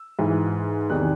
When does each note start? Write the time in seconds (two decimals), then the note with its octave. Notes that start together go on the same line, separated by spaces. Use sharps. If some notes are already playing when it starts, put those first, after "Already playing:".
Already playing: E6
0.19 G#2 E3
0.90 E2 C3 D#3 F#6